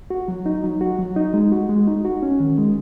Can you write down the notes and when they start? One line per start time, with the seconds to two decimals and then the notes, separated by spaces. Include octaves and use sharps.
0.10 F#4
0.28 F#3
0.46 D#4
0.64 F#3
0.81 F#4
0.99 F#3
1.16 D#4
1.33 G#3
1.52 F#4
1.69 G#3
1.87 D#4
2.05 F#4
2.23 C#4
2.40 D#3
2.58 G#3